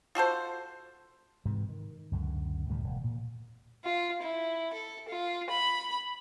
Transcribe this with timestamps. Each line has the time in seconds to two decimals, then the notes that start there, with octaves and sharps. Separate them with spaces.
0.15 F4 F#4 A4 C5
1.45 G#2 C3 E3
1.69 D#3
2.12 C#2 F#2 D3
2.69 D2 A2 D#3 G3
2.84 E1
3.04 A#2
3.84 F4
4.22 E4
4.73 A4
5.08 F4
5.49 B5